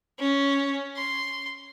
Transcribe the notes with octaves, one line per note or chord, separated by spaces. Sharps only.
C#4
C6